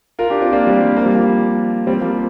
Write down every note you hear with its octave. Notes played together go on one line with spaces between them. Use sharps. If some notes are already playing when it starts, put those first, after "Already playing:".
F4 A#4
D4 G4
C4 F4
A#3 D4
G3 C4
G3
A#3
G3
F3 A#3
G3 C4
F3 A#3